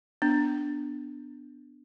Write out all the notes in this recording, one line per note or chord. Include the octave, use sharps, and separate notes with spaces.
B3 D4